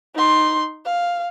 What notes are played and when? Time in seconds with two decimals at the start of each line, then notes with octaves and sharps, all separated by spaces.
0.15 D#4 C6
0.85 F5